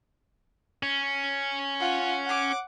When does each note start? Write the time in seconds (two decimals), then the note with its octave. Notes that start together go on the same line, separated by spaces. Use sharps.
0.83 C#4
1.80 F4 F#5
2.25 F#5 D6